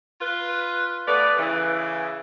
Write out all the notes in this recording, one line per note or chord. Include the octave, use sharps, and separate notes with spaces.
F4 B4
A3 B3 B4 D5
C#3 E3